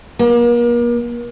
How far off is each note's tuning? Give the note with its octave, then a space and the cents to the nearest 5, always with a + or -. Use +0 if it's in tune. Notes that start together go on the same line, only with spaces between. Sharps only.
A#3 +40